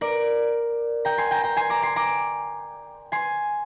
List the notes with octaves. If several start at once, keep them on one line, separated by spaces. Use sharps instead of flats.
A#4 D5
G5 A#5
G#5 C6
G5 A#5
G5 A#5
G#5 C6
A#5 D6
G#5 C6
A#5 D6
G#5 C6